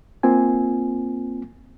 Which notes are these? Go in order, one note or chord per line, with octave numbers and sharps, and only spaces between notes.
A#3 C4 F4 G#5